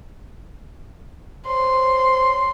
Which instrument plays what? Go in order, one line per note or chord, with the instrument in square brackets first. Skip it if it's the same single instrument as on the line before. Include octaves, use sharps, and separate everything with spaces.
[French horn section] C5 C#5 [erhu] C6